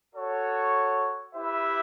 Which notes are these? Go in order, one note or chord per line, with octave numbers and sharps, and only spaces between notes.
F#4 A4 C#5
E4 G4 B4 E5